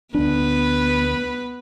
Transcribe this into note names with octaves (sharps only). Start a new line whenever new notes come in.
D2 B3 D4 B4